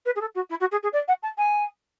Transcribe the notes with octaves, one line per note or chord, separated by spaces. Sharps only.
B4
G#4
A4
F#4
E4
F#4
G#4
G#4
D5
F#5
A5
G#5